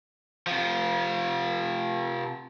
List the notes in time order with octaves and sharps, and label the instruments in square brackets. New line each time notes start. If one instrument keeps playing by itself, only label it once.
[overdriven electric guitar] C3 F3